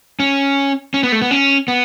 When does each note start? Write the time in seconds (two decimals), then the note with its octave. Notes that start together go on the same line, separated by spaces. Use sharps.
0.20 C#4
0.94 C#4
1.03 B3
1.12 A3
1.22 B3
1.31 C#4
1.68 B3